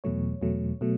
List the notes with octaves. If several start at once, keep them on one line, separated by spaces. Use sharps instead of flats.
E2 B2 F#3 A3 C#5
E2 B2 F#3 A3
B2 F#3 A3